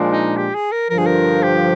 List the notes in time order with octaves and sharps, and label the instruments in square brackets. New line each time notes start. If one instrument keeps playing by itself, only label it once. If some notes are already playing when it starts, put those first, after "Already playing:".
Already playing: [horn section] A#2 F3 G#3 D4 F4
[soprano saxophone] D#4
G4
G#4
A#4
[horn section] G2 D3 F3 [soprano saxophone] A#4
[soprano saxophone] G#4
A#4
G4